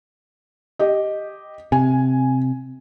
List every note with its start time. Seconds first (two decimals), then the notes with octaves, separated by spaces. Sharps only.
0.79 G4 D#5
1.72 C3 G#5